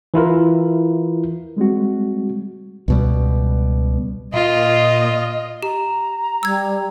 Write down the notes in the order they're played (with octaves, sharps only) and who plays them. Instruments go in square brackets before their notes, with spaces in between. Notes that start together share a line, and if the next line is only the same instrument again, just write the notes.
[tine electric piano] E3 E4 F4 A#4
[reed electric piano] G3 G#3 C4 F#4
[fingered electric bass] C#2 B2 G3
[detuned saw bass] A#2 [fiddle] F4 [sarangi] D#5
[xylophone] G4 [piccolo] A#5
[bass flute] G3 [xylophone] E6 G#6